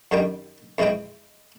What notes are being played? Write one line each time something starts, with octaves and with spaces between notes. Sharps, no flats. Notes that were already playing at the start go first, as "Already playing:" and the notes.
F#2 D3 D#3 G3 G5
F2 E3 G#3 E4 D#5 G5